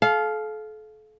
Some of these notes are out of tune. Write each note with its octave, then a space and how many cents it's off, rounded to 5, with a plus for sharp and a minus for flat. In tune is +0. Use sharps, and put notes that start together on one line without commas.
A4 -35 F5 +0